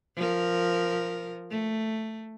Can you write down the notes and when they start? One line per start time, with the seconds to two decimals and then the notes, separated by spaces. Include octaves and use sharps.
0.16 F3 A#4
1.50 A3